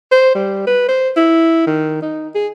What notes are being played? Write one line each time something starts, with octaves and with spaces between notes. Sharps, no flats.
C5
G3
B4
C5
E4
D#3
D#4
G#4